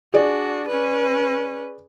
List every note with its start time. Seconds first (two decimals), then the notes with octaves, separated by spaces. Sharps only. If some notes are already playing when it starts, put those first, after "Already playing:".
0.14 D4 F#4 G#4 D5
0.68 C#4 B4